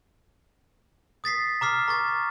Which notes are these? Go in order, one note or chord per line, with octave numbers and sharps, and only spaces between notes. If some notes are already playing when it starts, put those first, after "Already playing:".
D#6 A6 B6 C7
A#5 D6 F6 C7
A#5 C#6 A6